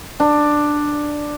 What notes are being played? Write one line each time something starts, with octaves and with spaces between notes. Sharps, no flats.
D4